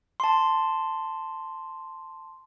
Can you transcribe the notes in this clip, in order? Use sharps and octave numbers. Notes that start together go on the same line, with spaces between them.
A5 C6